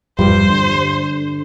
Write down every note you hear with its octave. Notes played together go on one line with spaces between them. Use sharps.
E2 G2 F3 G3 C5
D3